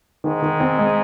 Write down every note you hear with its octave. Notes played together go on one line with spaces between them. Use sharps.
G#2 D#3
D#3
C4
G#3